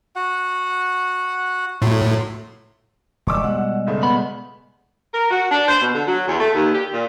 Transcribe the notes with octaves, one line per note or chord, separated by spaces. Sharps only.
F#4 F#5
A2 F#3 C6
D#1 A#2 G#3 D5 D#5 C#6 D6 E6
B2 G3 F#5
F#1 C#3 A3
B3 B5
A#4
F#4
D4
C5
B2
D3
F#3
E2
A3
D#2
G4
A#2